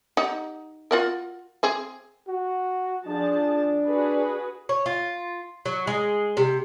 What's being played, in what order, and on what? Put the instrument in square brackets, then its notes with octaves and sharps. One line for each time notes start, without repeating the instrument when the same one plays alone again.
[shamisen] D#4 G4 F#5
F4 F#4 A#4
C4 G#4
[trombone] F#4
[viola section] F3 G#4 A5 [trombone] D4
[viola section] F#4 G#4 B4
[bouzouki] C#5
F4
F#3
G#3
C3